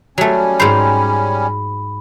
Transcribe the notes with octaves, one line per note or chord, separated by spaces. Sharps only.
F#3 G3 A3 C#4
G#2 C5 B5